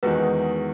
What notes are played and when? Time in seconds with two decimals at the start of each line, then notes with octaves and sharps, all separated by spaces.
0.03 E2 D#3 G#3 D#4 F#4 B4